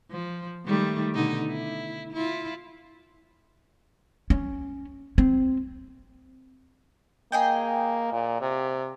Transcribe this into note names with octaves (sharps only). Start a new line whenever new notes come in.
F3
D#3 G3 A3
B2 D3 D#4
E4
E4 F4
C#4
C4
A#3 G#4 D#5 G5
A#2
C3